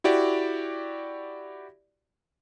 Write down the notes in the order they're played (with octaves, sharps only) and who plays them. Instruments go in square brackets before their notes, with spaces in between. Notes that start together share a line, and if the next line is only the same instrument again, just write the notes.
[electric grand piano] E4 F#4 G4 D5